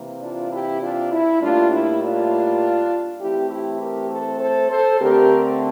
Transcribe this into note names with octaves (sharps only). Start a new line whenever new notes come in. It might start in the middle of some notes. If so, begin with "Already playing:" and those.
Already playing: C3 E3 A#3
D4 F4
E4 G4
D4 F4
E4
A2 G3 A#3 D4 F4
E4
D4 F4
E3 A3 C4 E4 G4
E4 G4
G4 A#4
A4 C5
A4 C5
A4 C5
D3 A3 C4 G4 A#4